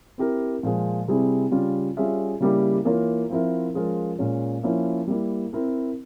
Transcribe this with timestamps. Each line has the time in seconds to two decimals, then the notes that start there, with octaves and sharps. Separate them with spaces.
0.18 C4 E4 G4 A#4
0.63 A#2 F3 G#3
1.08 C3 G3 C4 E4 G#4
1.52 C#3 G3 C#4 F4
1.97 G3 C#4 F4 G#4 E5
2.40 C#3 G3 A#3 E4 G4
2.85 E3 A#3 F4 A#4 C#5
3.30 F3 C4 E4 A#4 E5
3.74 F3 G#3 C#4 F4 A#4
4.19 A#2 G#3 C#4
4.63 F3 A#3 C#4 E4
5.07 G3 A#3 E4
5.53 C4 E4 A#4